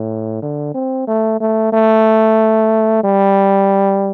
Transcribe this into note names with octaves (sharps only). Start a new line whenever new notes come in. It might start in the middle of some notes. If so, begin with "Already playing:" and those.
Already playing: A2
D3
C4
A3
A3
A3
G3